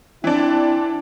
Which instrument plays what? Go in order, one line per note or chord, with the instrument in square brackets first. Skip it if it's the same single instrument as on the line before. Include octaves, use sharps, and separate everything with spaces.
[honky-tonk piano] E3 D4 [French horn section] C4 E4